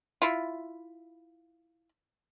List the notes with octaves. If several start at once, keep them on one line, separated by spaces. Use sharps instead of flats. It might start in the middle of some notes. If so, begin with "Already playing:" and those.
E4 F4